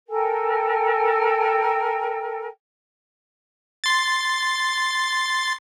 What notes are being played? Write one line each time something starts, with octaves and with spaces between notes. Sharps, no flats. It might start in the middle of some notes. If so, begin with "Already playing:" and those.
A4 A#4 G5 G#5
C6 A6